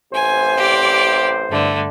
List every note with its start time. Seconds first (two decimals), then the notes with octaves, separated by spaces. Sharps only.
0.13 A1 C3 C5 G#5
0.57 G4 D5
1.49 G2 D3 A3